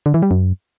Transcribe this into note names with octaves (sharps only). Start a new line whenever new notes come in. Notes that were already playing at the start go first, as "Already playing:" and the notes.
D3
E3
G3
F#2